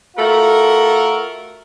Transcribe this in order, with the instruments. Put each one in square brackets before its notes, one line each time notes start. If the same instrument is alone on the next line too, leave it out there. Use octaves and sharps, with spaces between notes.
[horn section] A3 F4 F#4 A4 A#4